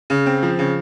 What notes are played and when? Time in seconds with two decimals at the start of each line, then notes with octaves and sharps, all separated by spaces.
0.10 C#3
0.26 C4
0.42 F3
0.59 C#3